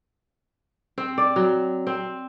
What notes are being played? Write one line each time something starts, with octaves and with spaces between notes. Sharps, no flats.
C4
D5
F#3
C4